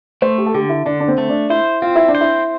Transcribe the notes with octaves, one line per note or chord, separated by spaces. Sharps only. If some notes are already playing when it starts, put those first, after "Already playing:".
A3 C5
G4
A4
D3 G4
E4
D3 D4
D4
C4
A3
D4
E4 C5
C4 F4
E4
D4
C5
E4